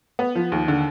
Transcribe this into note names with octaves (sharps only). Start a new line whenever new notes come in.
B3
F3
D#2
D3